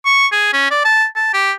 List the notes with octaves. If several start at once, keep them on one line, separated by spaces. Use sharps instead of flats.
C#6
G#4
C#4
D5
A5
A5
G4